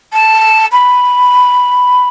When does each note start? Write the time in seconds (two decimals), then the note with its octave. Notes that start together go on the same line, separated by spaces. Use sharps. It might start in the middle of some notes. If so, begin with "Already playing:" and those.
0.13 A5
0.72 B5